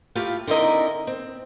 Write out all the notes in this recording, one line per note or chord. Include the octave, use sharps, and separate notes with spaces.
A3 E4 F4 G4 F5
D3 C4 D#4 E4 A#4 D#5
C4